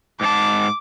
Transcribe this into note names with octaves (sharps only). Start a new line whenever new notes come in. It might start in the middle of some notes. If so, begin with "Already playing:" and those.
G#2 G4 A5 D6